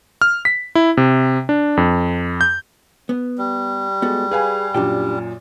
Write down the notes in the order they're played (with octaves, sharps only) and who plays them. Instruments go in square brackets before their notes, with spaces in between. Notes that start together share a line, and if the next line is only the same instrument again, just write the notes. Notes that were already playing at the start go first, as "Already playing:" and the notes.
[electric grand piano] F6
B6
E4
C3
D4
F2
G6
[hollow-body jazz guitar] B3
[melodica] G3
[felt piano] G#3 [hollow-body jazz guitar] B3 F#4 A4
[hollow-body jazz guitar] G#4 [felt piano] B4 F5 G#5
[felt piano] F#2 A#2 [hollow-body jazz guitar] D4 G4 G5